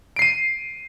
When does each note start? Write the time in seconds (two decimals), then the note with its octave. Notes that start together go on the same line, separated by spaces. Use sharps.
0.16 D7
0.19 C7
0.22 D#7